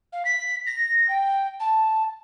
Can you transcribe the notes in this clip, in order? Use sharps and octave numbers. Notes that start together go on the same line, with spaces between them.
F5
B6
A#6
G5
A5